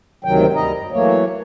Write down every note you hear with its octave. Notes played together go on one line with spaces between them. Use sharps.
D2 G#2 C3 D#3 F#3 G5
D2 G3 D#5 A#5
F#2
E3 F#3 A3 A#3 C#5